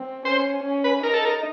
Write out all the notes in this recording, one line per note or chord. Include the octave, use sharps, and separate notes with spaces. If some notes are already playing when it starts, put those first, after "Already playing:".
Already playing: C4
C#4 C5
C#4
B4
D#4 A#4
A4
A#4